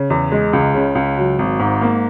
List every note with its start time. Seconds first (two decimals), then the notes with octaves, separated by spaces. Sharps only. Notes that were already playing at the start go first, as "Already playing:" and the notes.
Already playing: C#3
0.10 E2
0.32 G#3
0.53 C#2
0.74 C#3
0.95 C#2
1.17 F#3
1.39 G#1
1.60 G#2
1.82 A#3